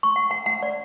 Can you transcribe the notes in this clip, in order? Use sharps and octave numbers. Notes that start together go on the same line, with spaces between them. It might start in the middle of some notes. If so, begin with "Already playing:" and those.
C#6
F#5
F#5
F#5
D5